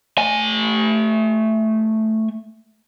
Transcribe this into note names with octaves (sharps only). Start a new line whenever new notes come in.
A3 G#5